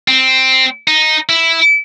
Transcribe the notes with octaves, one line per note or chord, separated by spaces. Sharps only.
C4
D#4
E4